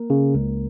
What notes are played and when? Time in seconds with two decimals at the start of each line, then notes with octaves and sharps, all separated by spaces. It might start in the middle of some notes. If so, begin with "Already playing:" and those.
Already playing: A#3 A#4
0.10 C#3
0.35 C#2